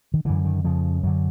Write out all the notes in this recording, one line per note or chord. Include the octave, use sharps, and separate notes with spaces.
D#3
F#2 D3 E3
D#3
F2 C#3 F3
F#2 D3 F#3